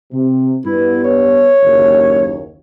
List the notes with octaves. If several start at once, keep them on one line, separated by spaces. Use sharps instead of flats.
C3
G2 B3 E4
C#5
F#1 D#2